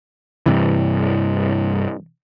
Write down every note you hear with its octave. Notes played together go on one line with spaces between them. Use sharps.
G2 C3 E3